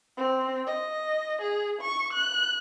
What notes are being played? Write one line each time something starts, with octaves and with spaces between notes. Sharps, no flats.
C4
D#5
G#4
C#6
F#6